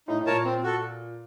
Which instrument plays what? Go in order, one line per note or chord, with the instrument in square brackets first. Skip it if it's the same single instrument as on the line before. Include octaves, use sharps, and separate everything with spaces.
[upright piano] A2 [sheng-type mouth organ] D#4
[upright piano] A2
[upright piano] A#2 [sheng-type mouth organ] A#4 C#5 A5
[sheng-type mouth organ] C4
F#4 A4